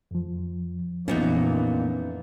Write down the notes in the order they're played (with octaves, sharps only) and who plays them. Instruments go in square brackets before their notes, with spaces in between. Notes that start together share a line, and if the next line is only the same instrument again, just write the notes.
[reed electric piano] F2 F3
[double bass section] A#1 F2 E3 [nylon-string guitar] A#2 B3 D#4 [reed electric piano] C#4